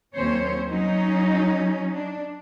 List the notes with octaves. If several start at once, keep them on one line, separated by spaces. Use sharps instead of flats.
D#2 F#3 C4 C#4 C5 C#5
F#3 C#4 D#4
D4